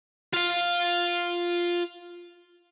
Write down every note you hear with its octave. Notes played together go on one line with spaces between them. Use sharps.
F4 F5